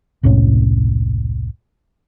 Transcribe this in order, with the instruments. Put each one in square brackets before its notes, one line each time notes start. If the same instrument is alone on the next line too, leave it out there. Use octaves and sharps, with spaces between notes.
[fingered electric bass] E1 C2 A2 C#4